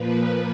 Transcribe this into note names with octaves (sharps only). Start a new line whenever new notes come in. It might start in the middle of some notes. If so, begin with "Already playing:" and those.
Already playing: A#2 F3 A#3 B4